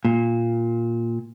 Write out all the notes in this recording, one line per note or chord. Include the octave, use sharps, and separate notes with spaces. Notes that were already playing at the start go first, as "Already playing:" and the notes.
A#2